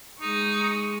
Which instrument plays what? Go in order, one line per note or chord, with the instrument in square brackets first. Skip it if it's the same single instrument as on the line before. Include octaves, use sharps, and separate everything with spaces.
[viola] G#3 C#6 [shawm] D#4